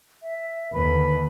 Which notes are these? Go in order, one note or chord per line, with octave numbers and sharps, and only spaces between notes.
E5
D#2 D3 B4 B5